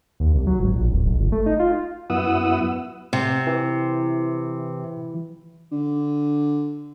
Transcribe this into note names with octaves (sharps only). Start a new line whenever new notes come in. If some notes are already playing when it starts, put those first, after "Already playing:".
D#2
C2
F#3
G#1
A#1
D1
B1
G1
A3
D#4
F4
F#2 B3 E4 F#5 D#6 E6
C3
E3
D3